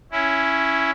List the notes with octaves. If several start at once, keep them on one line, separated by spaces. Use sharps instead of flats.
C#4 E4